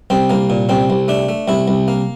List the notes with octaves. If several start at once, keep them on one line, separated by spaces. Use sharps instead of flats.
C2 C4
C2 A#3
A#2
C2 C4
C2
A3 D4
A3
C2 E4
C2
A#3